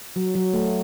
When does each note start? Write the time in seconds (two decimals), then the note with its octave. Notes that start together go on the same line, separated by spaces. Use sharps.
0.16 F#3
0.35 F#3
0.54 A3